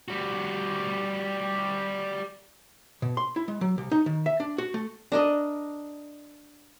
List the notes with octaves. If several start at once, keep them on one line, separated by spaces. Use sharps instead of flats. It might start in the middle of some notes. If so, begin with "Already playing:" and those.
G3 F#4
B2
C6
E4
G#3
F#3
C2
D#4
D#3
E5
D4
F#4
A3
D4 A#4 D#5